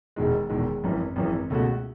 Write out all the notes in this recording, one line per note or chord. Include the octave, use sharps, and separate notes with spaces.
E1 E2 D#3 G#3
E1 E2 D#3 G#3
G#1 F#2 E3
G#1 F#2 E3
C#2 B2 A3 C#4 F#4